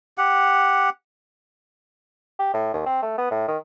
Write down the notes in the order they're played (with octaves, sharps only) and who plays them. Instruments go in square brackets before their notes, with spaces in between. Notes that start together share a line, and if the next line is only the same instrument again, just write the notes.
[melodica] G4 F#5
[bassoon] G4
A2
D#2
C4
A3
B3
A2
D#3